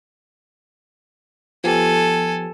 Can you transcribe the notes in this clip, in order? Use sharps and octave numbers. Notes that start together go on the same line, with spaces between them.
F3 B3 G4 A4 G#5